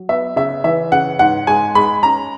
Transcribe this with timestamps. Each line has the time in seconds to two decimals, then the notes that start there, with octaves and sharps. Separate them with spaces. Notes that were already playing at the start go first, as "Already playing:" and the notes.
Already playing: F#3
0.09 B3 E5
0.36 C#3 E5
0.64 E3 E5
0.92 C#3 F#5
1.19 G#2 F#5
1.47 G#3 G#5
1.75 G#3 B5
2.03 C#4 A#5